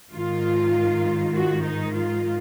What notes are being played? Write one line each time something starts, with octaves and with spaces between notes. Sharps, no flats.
G#2 D#3 F4
F#4
D#4
F4